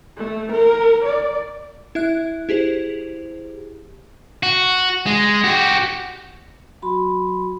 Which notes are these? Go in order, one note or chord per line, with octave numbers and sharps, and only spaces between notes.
A3
A#4
D5
E4 E5 F#6
E4 G4 G#4 C5
F#4
G#3
F#4 G4
F#3 F#4 B5 C6